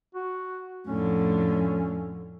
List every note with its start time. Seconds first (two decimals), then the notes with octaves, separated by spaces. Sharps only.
0.15 F#4
0.87 F2 A2 D3 C#4